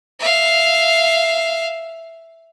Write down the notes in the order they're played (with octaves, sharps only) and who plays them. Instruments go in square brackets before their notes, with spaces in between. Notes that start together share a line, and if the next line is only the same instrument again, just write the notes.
[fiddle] E5 F5